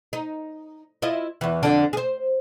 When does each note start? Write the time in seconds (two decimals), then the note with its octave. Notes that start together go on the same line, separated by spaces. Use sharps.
0.13 D#4
1.02 E4 F4 D#5
1.41 E2 E3
1.63 F2 D3 D4
1.93 G#4 C5